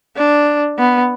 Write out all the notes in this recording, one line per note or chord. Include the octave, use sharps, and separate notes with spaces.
D4
B3